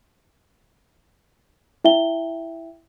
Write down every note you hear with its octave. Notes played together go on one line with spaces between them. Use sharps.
E4 E5 G5 G7